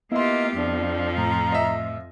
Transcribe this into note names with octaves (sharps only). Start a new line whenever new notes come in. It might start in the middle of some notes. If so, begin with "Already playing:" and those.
A#3 B3 E4 F4 G4 D#5 C6
F2 F3 D4
A2 A3 A#5
D#5 E5